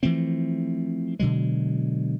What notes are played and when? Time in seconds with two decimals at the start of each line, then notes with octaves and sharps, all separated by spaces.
0.03 E3 F3 A3 C4
1.19 B2 D3 F#3 G#3